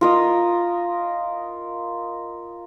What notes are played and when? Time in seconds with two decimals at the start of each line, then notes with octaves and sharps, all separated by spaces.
0.01 F4 A#4 D#5